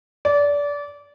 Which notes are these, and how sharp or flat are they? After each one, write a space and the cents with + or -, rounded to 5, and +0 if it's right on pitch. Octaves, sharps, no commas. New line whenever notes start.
D5 -25